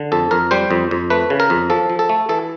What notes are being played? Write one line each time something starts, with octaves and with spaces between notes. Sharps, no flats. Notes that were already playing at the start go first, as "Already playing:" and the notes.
Already playing: D3
F2 A4
F2 A#4
G3 C5
F2
F2
A3 B4
C#3
A#4
F2
F3 A4
F3
A4
A3
E3 A4